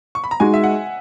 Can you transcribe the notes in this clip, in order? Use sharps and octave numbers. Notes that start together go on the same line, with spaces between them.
C#6
B5
A#5
G#3 D#4 F#4 G#5
E5
F#5